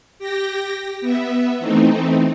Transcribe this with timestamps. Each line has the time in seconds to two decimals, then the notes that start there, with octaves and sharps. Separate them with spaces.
0.19 G4 G5 A#6
1.01 B3 E5
1.59 E3 A3 C4 D#4